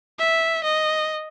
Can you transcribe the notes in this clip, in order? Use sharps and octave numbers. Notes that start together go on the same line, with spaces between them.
E5
D#5